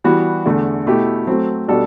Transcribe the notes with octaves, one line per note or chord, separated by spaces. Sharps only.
E3 G3 B3 F#4
E2 D3 A3
B2 A3 E4 G4
F#3 A3 C4
B2 G3 D4 F#4 A4